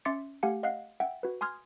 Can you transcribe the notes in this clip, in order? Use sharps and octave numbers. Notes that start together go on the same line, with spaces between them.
C#4 E5 C6 D6 A6 C#7
A3 G4 F5 F#5 G#5 C#7
D#5 F5 F#5 F#6 C7
E5 F#5 G5
F#4 B4
G#5 C6 D#6 F6 G#6